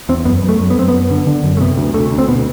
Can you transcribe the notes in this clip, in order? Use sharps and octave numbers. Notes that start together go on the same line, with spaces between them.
E2 C4
F#2 B3
F#2
A3
F#2
B3
F#2 C4
F#2 B3
D3
D3
F#2
A3
C3 B3
D2
D2 A3
D2
C4
B2 B3